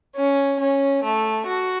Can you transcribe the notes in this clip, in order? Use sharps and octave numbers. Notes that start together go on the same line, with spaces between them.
C#4
C#4
A3
F#4